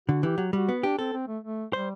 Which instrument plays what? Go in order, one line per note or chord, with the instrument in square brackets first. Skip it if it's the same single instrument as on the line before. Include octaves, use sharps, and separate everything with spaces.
[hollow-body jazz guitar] D3 [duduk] F#4
[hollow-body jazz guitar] E3 [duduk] G4
[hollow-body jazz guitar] F#3
[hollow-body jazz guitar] G3 [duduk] F#4
[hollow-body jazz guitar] B3
[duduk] D4 [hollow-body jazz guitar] G4
[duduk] C4 [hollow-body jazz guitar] A4
[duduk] C4
A3
A3
[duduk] G3 [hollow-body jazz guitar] C5